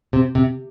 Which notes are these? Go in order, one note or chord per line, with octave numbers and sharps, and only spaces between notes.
C3
C3